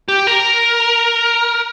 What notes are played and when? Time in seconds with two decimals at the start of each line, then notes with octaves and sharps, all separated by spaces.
0.08 G4
0.27 A#4